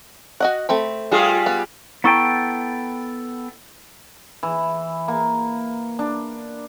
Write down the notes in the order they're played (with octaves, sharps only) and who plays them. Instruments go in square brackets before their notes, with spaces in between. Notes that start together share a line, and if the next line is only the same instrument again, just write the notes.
[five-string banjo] F#4 D#5 F#5
A3 C4 B5
[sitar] G3 F4 G#4
[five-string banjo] B3
[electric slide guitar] B3 A4 G5 [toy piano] E4 A#5 C#6
[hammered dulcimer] E3
A#3
D4